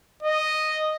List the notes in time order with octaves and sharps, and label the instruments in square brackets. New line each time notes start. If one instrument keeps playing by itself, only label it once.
[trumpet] D#5